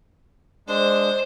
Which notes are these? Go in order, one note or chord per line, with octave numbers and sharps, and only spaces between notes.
G#3 D4 C5